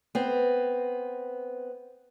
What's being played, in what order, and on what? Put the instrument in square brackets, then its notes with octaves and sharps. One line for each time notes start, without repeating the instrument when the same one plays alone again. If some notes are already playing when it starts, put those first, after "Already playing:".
[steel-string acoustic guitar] B3 C4